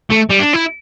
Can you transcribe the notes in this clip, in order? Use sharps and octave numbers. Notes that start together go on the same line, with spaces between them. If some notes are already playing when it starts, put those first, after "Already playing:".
A3
G3
D4
E4